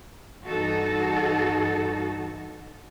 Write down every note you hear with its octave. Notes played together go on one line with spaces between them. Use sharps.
G2 E3 D#4 F#4 A4